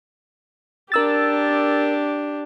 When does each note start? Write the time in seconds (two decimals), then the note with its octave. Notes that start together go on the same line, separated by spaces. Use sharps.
0.92 D4 G4 A#4 E6 A6